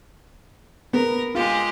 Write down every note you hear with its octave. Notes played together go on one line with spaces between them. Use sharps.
B3 A#4
G#3 F4 G4